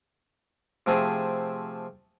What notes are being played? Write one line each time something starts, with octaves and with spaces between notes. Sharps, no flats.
C3 F3 A3 C4 G#4